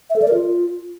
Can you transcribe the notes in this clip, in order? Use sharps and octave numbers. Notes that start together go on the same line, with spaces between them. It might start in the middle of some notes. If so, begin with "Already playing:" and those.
E5
A4
D5
A#4
F4